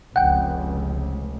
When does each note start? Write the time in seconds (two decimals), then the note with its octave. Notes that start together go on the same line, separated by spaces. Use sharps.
0.16 F1 C#2 F#5 G5